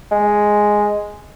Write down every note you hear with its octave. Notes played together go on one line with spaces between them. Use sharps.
G#3